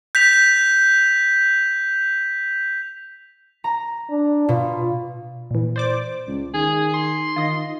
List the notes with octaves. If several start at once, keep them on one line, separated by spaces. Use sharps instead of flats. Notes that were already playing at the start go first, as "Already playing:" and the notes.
G6 B6 F7
A#5
D4
B2 F4
A#2 E3
C5 D5 D6
C#2
D#3 G#4
C6
D#3 F4 D#5